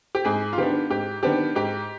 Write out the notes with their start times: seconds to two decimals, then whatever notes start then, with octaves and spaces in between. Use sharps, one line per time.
0.15 G4
0.25 G#2 G#4
0.53 F4
0.58 D#3 B3 D4 G4
0.90 G#2 G4
1.23 D#3 B3 D4 G4
1.55 G#2 G4